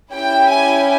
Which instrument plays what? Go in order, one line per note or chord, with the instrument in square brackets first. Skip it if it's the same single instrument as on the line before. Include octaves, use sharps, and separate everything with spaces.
[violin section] C#4 E4 G4 G5
G#5